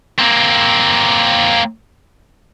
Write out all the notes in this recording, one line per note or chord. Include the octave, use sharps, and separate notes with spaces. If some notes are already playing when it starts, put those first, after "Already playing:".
A#3 C4